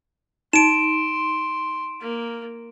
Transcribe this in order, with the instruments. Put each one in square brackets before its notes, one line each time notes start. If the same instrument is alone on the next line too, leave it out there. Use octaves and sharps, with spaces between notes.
[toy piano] D#4 [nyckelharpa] C6 [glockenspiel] D7 E7
[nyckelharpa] A#3